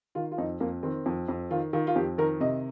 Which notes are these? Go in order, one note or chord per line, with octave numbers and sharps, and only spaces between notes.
D#3 F4
F4
F2 D#4
F2 A#3
D#3 C4
F2
F2
D#3 F4
D#3 F4
F4
F2 G4
D#3 A#4
C3 D#5